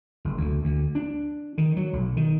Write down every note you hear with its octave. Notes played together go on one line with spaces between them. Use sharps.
F#1
D2
D2
D4
D#3
F#3
B1
D#3